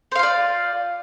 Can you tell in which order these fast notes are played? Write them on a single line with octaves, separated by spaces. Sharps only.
C5 F5 F4 D5